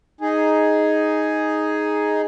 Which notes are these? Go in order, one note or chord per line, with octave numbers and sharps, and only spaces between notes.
D#4 G#4